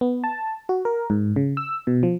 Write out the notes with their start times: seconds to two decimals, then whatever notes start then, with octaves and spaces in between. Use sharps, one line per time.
0.01 B3
0.24 A5
0.69 F#4
0.85 A#4
1.10 G#2
1.36 C#3
1.57 E6
1.87 B2
2.03 F3